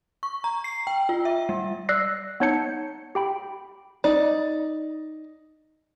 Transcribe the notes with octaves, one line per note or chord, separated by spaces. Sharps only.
C#6
A#5
C7
G5
F4
E5
G3
D5 E6 F#6 A#6 C7
B3 D#4 C#5 A5 G6 C#7
G4 G5 B5
D#4 D5